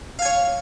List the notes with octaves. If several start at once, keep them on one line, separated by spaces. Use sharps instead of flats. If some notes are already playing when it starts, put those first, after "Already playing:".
C#5 F5 G#5